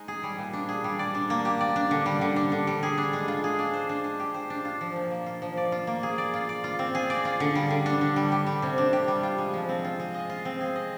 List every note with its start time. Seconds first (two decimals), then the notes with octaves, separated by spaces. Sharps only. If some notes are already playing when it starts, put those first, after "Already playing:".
Already playing: G#3 D#4
0.08 G#4
0.23 G3
0.38 A#2
0.53 D4
0.69 G#4
0.84 G3
0.99 D5
1.15 D4
1.30 A#3
1.45 G4
1.61 D5
1.76 D4
1.91 D3
2.06 G3
2.21 D3
2.36 D4
2.52 D3
2.67 G3
2.83 G#4
2.98 D4
3.13 G#3
3.28 F4
3.44 G#4
3.59 D4
3.74 C5
3.89 D4
4.04 G#3
4.20 G4
4.34 C5
4.50 D4
4.65 F4
4.81 F3
4.96 A#2
5.11 A#3
5.26 F4
5.42 F3
5.57 D5
5.72 F4
5.87 A#3
6.03 G#4
6.18 D5
6.34 F4
6.49 D5
6.64 F4
6.79 C4
6.95 G#4
7.10 D5
7.25 F4
7.40 D3
7.55 G3
7.70 D3
7.86 D4
8.01 D3
8.16 G3
8.32 G4
8.47 G3
8.62 C3
8.78 D4
8.93 G4
9.08 G3
9.23 F4
9.38 G#3
9.54 F3
9.69 C4
9.84 F4
10.00 G#3
10.14 D#5
10.30 F4
10.45 C4
10.61 G#4
10.76 D#5